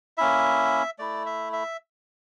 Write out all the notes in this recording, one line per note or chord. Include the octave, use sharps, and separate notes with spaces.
A#3 C#4 E4 E5
A3 E4 D5
E5
E5